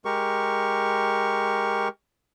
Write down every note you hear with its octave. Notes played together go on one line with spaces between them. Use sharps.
G#3 G4 A#4 C#6